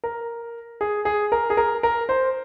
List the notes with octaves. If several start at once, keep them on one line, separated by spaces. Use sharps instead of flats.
A#4
G#4
G#4
A#4
G#4
A#4
A#4
C5